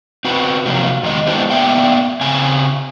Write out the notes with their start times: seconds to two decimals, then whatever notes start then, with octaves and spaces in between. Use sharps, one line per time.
0.25 C4 F#4 B4
0.66 C3 F3 F#3 A#3
1.03 E2 D#3 G#3 D#5
1.27 G#3 B3 D4 E4 G4 C5
1.50 A#3 B3 D5 E5 G5
2.21 C#3 C4 G#5